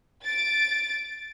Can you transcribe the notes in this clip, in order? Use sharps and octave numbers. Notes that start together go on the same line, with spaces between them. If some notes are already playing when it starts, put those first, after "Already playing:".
A6 D7